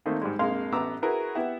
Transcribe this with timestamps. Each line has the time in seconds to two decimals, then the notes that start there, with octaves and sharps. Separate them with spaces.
0.06 D#3 A3 A#3 C4 D#4
0.21 G#2 G3 G#3
0.39 A#1 F2 G#3 A#3 F5 C6
0.72 A1 B3 A#5 D6 E6
1.02 E4 F#4 G#4 A#4 B4
1.35 B3 E4 G4 E5 F#5